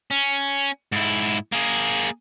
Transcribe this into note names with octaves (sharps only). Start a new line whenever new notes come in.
C#4
G#2 E4
A#3 G#4